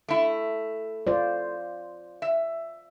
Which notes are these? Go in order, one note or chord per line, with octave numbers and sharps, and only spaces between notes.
A3 E4
F4 C5 D5
E5